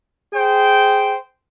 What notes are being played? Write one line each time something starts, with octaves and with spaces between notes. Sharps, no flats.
G#4 C5 G5